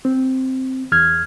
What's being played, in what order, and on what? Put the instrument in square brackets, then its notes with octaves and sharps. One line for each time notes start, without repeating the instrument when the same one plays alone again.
[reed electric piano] C4
E2 F6 G#6